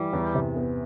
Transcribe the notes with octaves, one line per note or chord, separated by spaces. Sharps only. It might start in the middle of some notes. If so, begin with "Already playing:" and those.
Already playing: E3 G3
E2
C3
B3